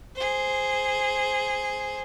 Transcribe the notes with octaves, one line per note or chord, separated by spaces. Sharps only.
G#4 C5